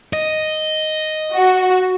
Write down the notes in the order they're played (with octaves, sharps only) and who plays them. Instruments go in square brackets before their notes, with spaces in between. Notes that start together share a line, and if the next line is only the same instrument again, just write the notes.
[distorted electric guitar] D#5
[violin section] F#4